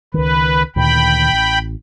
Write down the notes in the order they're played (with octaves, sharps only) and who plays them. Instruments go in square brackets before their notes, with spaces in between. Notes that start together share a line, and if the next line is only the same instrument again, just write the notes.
[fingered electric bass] C#2 D#3 [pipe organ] B4
[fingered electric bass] D2 A#2 D#3 [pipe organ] G5 B5
[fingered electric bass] A1